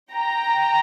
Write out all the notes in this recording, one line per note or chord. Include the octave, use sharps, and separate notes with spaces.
G5 A#5